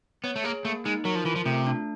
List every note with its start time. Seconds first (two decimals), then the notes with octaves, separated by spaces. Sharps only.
0.24 B3 C#5
0.36 A3
0.44 A#3 G#4
0.65 A3 A#3
0.85 G#3 D#4
1.05 F#3 A#4
1.15 F3
1.25 E3 F4
1.36 F3
1.46 C3 A3
1.67 D4